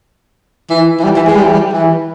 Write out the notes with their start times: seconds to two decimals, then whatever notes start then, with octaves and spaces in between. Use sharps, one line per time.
0.70 E3
1.00 E3
1.04 G3
1.16 E3
1.27 G#3
1.36 G3
1.44 E3
1.52 G3
1.73 E3